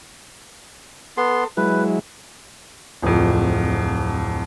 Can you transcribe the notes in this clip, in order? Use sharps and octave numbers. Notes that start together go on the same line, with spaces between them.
B3 A4 C6
F#3 G#3 E4 B4
D1 F2